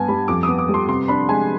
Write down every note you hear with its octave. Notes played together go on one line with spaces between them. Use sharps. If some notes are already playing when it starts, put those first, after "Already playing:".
Already playing: G2 B3 G#5
G3 B5
F2 D6
D#6
B3
D6
G3
C6
C3 C6
D4 B5
G#3 G#5